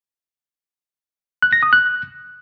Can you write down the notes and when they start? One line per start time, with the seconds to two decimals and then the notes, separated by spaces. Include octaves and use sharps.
1.42 F#6
1.53 A#6
1.63 D#6
1.73 F#6